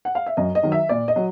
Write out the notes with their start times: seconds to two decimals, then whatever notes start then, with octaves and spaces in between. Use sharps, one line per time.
0.05 F#5
0.15 F5
0.26 E5
0.37 F#2 D#5
0.55 D#5
0.63 D#3 F#3
0.72 E5
0.89 A#2 D5
1.08 D#5
1.16 F#3